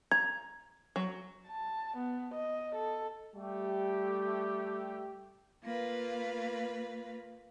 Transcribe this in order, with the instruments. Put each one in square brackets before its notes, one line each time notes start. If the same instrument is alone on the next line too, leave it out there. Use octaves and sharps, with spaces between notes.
[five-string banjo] A#5 [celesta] G#6
[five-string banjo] F#3
[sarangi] A5
B3
D#5
A4
[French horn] G3 [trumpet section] A3 G4
[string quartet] A#3 F4 B4